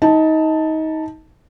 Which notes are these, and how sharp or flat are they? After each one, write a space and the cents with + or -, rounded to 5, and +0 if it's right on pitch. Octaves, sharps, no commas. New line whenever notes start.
D#4 +25 A5 +0